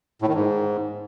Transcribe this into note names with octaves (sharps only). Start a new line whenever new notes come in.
A2
D#3
G#2